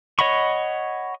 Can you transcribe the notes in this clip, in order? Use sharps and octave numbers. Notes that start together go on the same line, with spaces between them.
C#5 D#5 F#5 B5 C#6